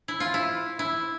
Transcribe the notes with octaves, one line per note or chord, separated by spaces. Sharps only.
E4
F4
E4
E4